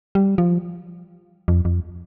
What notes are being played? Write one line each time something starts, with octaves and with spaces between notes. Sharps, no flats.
G3
F3
F2
F2